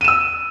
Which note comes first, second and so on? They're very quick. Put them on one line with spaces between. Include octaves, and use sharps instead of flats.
D#7 E7 E6